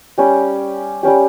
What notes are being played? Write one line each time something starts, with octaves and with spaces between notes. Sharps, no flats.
G3 C#4 G4
G3 C#4 G4